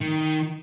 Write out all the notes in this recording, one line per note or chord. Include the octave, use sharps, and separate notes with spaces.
D#3